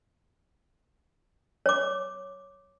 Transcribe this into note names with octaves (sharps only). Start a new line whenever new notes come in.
C#5 D6